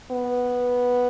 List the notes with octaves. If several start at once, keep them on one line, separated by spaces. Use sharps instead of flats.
B3